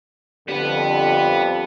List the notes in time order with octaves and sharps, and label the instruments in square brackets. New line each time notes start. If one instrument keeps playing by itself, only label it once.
[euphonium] F2 [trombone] D3 [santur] G3 G5 [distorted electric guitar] B3 B4